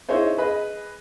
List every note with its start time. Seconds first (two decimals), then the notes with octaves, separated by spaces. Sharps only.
0.09 D#4 E4 G#4 C5 C#5
0.38 G#4 B4 D#5